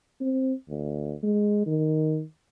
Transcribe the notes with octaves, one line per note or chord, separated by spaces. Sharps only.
C4
D2
G#3
D#3